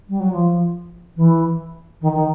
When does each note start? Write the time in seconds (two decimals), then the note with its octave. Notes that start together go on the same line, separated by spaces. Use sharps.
0.09 G3
0.20 F#3
0.32 F3
1.16 E3
2.01 D#3
2.14 D#3